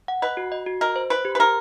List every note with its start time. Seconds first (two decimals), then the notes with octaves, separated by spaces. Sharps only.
0.08 F#5
0.22 B4 D#5
0.37 F#4
0.52 D#5
0.66 F#4
0.81 A#4 D#5
0.96 C5
1.10 B4 C5
1.25 G4
1.35 B4
1.39 G4 A#4